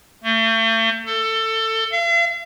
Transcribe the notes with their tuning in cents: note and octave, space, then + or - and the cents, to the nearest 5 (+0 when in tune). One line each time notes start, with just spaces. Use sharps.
A3 +40
A4 +20
F5 -45